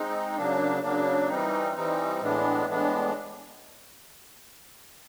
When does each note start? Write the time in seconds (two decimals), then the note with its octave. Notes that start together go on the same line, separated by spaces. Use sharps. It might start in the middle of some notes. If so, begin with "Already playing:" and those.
Already playing: G#3 C4 D#4
0.37 C#3 F#3 A#3 D4
0.83 C#3 F#3 A#3 D4
1.29 E3 G3 C4 D#4
1.75 E3 G3 C4 D#4
2.21 A2 E3 G#3 B3 D4
2.67 A2 E3 G#3 B3 D4